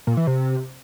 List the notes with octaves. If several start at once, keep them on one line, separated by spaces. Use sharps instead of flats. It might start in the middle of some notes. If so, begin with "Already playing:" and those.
A#2
E3
C3